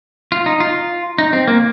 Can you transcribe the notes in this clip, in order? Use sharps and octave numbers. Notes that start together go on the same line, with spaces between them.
F4
D#4
F4
D#4
C4
A#3